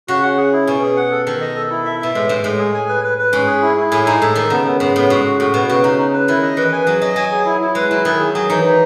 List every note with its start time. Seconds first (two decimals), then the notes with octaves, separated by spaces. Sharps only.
0.08 C#3 F#4
0.23 F#5
0.38 G#4
0.53 E4
0.67 B2 C#4
0.82 G#4
0.97 F#5
1.11 A4
1.26 D#3 A4
1.41 D#5
1.56 A4
1.70 E4
1.85 E5
2.00 B2 E5
2.15 A2 G#3
2.29 G#2 G#3
2.44 A2 G#3
2.59 G#4
2.74 G#5
2.88 B4
3.03 B4
3.18 B4
3.33 G#2 C#4
3.47 G#4
3.62 E4
3.77 E4
3.92 A2 G#5
4.06 G#2 D#4
4.21 A2 A4
4.35 D#3 D#4
4.50 C#3 B3
4.65 B3
4.80 G#2 B3
4.95 A2 B3
5.10 G#2 F#4
5.25 F#4
5.40 A2 F#4
5.54 B2 B3
5.69 C#3 F#4
5.83 C#3 D#4
5.98 D#4
6.14 B4
6.28 D#3 E4
6.43 D#5
6.57 E3 B4
6.72 G#5
6.87 F#3 G#4
7.01 F#3 D#5
7.16 F#3 G#5
7.32 G#4
7.46 E4
7.61 E4
7.75 G#3 B4
7.90 F#3 E4
8.05 D#3 G#4
8.20 G#4
8.34 F#3 G#4
8.49 E3 D#4
8.64 D#4